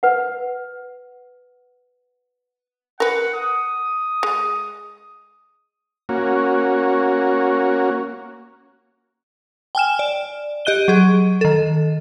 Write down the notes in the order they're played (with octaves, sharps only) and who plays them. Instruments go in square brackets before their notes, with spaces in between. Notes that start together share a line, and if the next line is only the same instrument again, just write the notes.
[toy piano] B4 F#5
[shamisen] A#4 B4 [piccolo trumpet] F#5
[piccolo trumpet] D#6
[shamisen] G#3
[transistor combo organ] A#3 C#4 F#4
[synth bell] G5 G#5 F6 E7
D5
G4 D#5 F#6 D#7 G7
F#3 G#4
D#3 A4